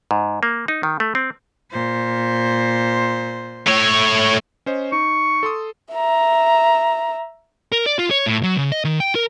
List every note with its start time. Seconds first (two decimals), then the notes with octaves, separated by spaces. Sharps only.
0.11 G#2
0.43 A#3
0.68 D#4
0.83 D#3
1.00 A3
1.15 C4
1.71 A#2 C5
3.67 A3 C#5
4.66 C#4 C5 D#5
4.92 D#4 C#6
5.43 A4 C6 D#6
5.93 E5 A#5
7.72 A#4
7.86 D5
7.99 F4
8.11 C#5
8.26 A2
8.43 F#3
8.56 C#3
8.72 D#5
8.85 D#3
9.00 G5
9.15 A#4